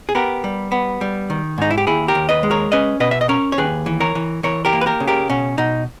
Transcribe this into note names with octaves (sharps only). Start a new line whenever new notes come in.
G#4
B3 G4 A#4
G3
B3
G3
D#3
G#2 D#4
E4
G4
D#2 E4 G#4
G4 A#4
D#2
B4 D#5
G#3
A#4 C#5
C#4 B4 D#5
B2 B4 D#5
E5
D#5
C#4 A#4 C#5
C#5
D#2 G#4 B4
E3
A#4 C#5
E3
E3 A#4 C#5
G4 A#4
A#3
B4
G4 A#4
C#3
G4 A#4
B2 C#4
B2 D#4